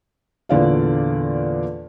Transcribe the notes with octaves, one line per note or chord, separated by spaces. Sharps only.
E2 A#2 D3 D5 F5